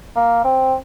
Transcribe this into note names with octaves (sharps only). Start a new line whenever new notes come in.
A#3
C4